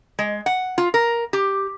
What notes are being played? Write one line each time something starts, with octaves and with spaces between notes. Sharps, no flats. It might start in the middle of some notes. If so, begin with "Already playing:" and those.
G#3
F#5
F4
A#4
G4